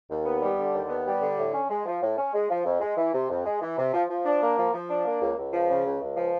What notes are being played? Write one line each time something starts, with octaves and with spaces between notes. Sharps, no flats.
D#2
B3
G3
D3
D#2
B3
G3
D3
A2
C#4
G#3
F3
A2
C#4
G#3
F3
F2
G#3
E3
C3
F2
G#3
E3
C3
F3
F3
D4
A#3
F3
F3
D4
A#3
C#2
C#2
F3
C#3
C#2
C#2
F3